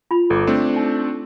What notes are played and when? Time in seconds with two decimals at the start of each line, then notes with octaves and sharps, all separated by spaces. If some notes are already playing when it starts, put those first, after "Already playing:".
0.11 F4 B5
0.30 G1 A4 D6
0.47 A3 C4 D4
0.76 D#4